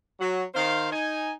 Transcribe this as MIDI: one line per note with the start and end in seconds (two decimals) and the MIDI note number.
0.20 0.43 54
0.20 0.43 66
0.55 0.90 51
0.55 0.90 72
0.55 0.90 77
0.92 1.32 63
0.92 1.32 80